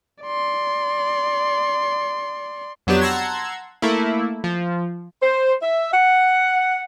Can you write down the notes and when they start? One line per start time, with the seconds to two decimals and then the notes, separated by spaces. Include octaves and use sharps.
0.23 D5 C6
2.87 F2 F#3 B3 D4 G4 E7
3.01 F#5 A5 A#5 C6 E6 G#6
3.82 A3 A#3 E4
4.44 F3
5.22 C5
5.62 E5
5.92 F#5